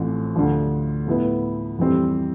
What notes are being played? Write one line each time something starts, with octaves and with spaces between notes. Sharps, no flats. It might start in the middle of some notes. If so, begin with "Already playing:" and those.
Already playing: A1 A2 F3 C4
D2 D3 F3
A2 F3 B3 E4 B4
F2 E3 G3 C4 G4